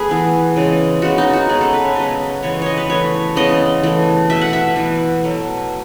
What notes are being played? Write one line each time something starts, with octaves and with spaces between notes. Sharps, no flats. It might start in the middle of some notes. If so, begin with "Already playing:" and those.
Already playing: A3 G#4 B4
E3 B3
C#3 E3 G#3
C#3 G#3 B3 F#4
D#4
F#4
C#3 G#3 B3 G#4
A4
B4
C#5
C#3 F#3 B3 D#5
C#3 E3 G#3 B3 C#5
C#5 D#5
B4
E3 A3 C#5
C#3 E3 G#3 B3 D#5
E3 A3
B2 A3 E5
F#5
E5
E3 B3
B2 F#3 A3